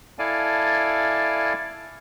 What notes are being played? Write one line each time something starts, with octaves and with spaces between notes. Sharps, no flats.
E4 A4 D5 F5 G#5 A5